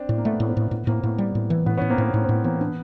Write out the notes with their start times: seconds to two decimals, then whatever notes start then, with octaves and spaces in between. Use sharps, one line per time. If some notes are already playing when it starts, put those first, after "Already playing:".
Already playing: C4 D4
0.09 A2
0.18 A#3
0.25 A3 B3
0.40 A2
0.48 A#3 C4
0.57 A2
0.71 A2 B3
0.87 A2 A#3 C4
1.03 A2 B3
1.18 G3
1.35 A2
1.50 E3
1.66 A2 B3
1.77 A2 B3 C#4
1.90 A#3 C4
1.98 A2 B3
2.14 A2 A#3
2.24 C4
2.29 A2 B3
2.44 E3 A#3 C4
2.61 B3 D4